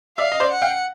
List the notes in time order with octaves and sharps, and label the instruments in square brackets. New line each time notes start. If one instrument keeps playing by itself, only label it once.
[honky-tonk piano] D5 E5 [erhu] F5
[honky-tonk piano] D#5
C5 D5
[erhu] F#5
[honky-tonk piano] F5 G5